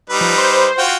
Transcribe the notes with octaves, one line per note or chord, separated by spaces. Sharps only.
G3 D#4 B4
F3
C5
F4 F#4 G5